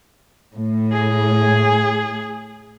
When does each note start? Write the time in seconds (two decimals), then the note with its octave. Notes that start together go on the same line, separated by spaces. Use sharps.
0.55 A2
0.93 G#4